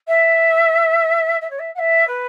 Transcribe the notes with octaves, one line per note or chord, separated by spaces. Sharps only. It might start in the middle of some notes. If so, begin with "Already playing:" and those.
E5
E5
C#5
E5
F#5
E5
B4